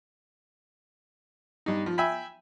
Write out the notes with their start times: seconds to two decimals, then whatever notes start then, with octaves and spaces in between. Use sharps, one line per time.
1.66 G2 D#4
1.86 F3
1.98 E5 G5 G#5 B5